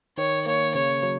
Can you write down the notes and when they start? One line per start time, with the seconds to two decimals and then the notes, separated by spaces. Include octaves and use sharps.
0.18 D#3 C#5
0.46 A#3 C#5
0.75 C#3 C#5
1.03 F#3